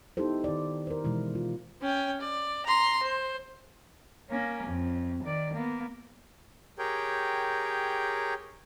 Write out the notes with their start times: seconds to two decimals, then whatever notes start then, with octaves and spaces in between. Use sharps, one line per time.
0.17 B3 D#4 E4 G4 A4 C5
0.44 D#3 D5
0.87 A#4 C5
1.04 B2 E3 G#3 E4
1.35 F4
1.82 C#4 G5
2.21 D5
2.66 A#5 C6
3.03 C5
4.30 A#3 C#4
4.67 F2
5.24 D#3 D5
5.54 A#3 B3
6.78 G4 G#4 A#4 C#5 G5